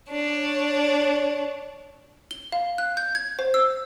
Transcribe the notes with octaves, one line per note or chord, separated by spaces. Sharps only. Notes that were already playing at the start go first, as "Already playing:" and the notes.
D4 C#5
G7
F5
F#6
G6
G#6
C5
E6